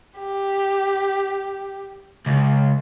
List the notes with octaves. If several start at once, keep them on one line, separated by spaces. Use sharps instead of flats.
G4
C#2